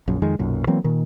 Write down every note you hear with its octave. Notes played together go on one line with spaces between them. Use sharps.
A#1 F#2
F2 D#3 G#3
B1 F#2 A#2
E3 F#3 A#3 C4
A#2 D#3